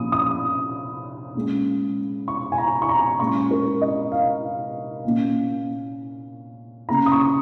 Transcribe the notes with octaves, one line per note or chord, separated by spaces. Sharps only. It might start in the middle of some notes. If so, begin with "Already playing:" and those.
Already playing: A#2 F3 C#4 D#6
D#6
A#2 G#3 C#4
C#6
G#5
A#5
C#6
A#5
A#2 G#3 C#4 C#6
A#4
D#5
F5
A#2 A#3 C#4
C#3 A#3 C#4 A#5
D#6
C#6